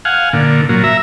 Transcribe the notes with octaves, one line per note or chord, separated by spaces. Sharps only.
F5 F#5 G#5
A#2 D3
A#2 F#3
E5 A#5